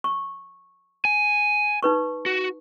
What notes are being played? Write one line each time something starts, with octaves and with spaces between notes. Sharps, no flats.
C#6
G#5
D#4 B4 C#6
F#4